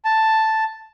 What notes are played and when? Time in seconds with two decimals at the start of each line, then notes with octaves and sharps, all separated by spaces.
0.05 A5